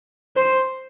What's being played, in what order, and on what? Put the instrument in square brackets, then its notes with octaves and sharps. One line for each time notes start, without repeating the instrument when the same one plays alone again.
[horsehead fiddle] C5